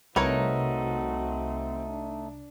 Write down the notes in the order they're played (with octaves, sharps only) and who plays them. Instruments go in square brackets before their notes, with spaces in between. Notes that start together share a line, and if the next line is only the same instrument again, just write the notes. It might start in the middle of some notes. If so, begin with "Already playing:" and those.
[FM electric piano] C2 [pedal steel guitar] A3 D#4 [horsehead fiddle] C4 F#4 [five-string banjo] A#4 B4 C#5
[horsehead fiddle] D4